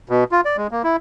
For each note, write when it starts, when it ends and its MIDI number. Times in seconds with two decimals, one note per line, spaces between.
0.09 0.24 47
0.32 0.41 65
0.45 0.57 74
0.57 0.67 56
0.71 0.82 58
0.84 0.96 64